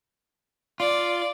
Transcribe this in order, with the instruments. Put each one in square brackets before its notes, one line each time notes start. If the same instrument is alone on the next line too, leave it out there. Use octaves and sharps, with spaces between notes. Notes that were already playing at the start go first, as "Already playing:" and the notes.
[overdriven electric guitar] F4 [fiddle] D5